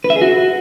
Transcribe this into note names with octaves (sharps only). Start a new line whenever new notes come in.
B4
E5
G#4
F#4